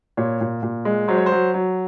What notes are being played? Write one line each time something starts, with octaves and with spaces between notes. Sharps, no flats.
A#2 C#5
A#2
A#2
G#3
F#3 C5
C#5
C5
F#3
F#3